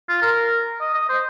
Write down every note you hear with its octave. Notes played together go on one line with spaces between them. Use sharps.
F4
A#4
D#5
D#5
C5